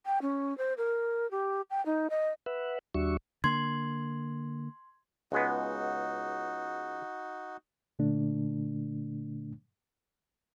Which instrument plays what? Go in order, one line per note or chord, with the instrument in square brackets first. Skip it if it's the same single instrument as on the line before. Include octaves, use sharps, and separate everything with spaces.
[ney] G5
C#4
C5
A#4
G4
G5
D#4
D#5
[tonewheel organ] B4 E5 F#5
D#2 G3 D4 F#4 E5 C#6
[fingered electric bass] D3 A#3 [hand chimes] C6 G#6
[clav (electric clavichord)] C#2 G#3 B3 [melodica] D#4 F#4
[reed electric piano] A#2 D3 A3 D4